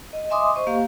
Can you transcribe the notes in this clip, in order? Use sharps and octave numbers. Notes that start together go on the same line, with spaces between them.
D#5
D#5 E5 G#5 C6 D6 D#6
C5 D#5 C#6
A#3 G4 F5